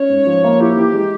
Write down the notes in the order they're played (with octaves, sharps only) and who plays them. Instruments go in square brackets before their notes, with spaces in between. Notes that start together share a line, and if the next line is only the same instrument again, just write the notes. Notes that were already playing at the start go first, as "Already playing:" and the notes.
Already playing: [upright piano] C#4 [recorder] C#5
[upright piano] G#2
F3
A#3
[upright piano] E4 [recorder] G4
[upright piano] E3
G#3